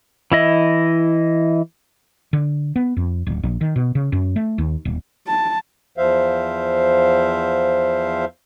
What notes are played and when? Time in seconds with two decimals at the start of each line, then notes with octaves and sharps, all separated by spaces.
0.32 E3 E4 D#5
2.33 D3
2.76 B3
2.97 F2
3.27 D1
3.43 A#1
3.61 D#3
3.76 B2
3.95 C#3
4.12 F#2
4.36 A3
4.58 D#2
4.85 D#1
5.27 A5
5.98 E2 F3 C5 E5 F5